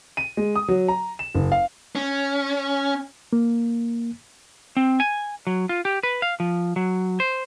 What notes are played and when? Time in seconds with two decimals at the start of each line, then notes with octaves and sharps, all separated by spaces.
0.17 D#7
0.37 G#3
0.56 D#6
0.68 F#3
0.88 A#5
1.19 E7
1.35 F#1
1.52 F5
1.95 C#4
3.33 A#3
4.77 C4
5.00 G#5
5.47 F#3
5.69 F4
5.85 G4
6.03 B4
6.22 F5
6.40 F3
6.76 F#3
7.20 C5